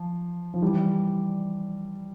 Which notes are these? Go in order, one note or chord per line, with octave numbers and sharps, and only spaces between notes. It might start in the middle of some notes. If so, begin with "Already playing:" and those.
Already playing: F3
F3
E3 G3